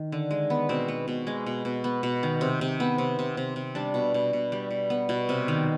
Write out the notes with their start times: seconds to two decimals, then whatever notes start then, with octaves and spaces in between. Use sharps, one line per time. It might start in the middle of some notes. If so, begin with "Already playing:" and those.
Already playing: D#3
0.12 D3
0.31 G#3
0.50 B3
0.69 B2 C4
0.88 B3
1.08 B2
1.27 G#3
1.46 B2
1.65 B2
1.84 B3
2.03 B2
2.23 D#3
2.41 C3
2.61 C3
2.80 B3
2.98 C3
3.19 C3
3.37 C3
3.56 C3
3.75 G3 D4
3.94 B2
4.14 B2
4.33 B2
4.52 G3
4.71 B2
4.90 B3
5.09 B2
5.29 C3
5.48 D#3